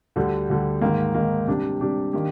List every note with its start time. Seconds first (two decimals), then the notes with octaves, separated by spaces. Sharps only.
0.16 D2 D3 G3
0.49 D2 D3 G3
0.81 G#2 D#3 A#3
1.15 G#2 D#3 A#3
1.47 C3 G3 D4 G4
1.81 C3 G3 D4 G4
2.13 D#3 A#3 D4 G4